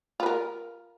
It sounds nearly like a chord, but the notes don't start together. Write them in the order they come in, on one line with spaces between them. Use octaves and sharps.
F4 B4 A#4